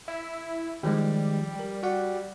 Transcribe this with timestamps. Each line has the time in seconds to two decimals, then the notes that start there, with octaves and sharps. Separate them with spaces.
0.08 E4
0.83 D#3 F3 G3 G#3
1.59 A#4
1.83 F#4 D5 F#5